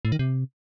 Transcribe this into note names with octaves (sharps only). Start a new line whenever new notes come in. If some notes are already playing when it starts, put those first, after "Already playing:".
A2
D#3
C3